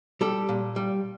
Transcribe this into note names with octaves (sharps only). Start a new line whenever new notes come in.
G3 G4 A4
A#2
G3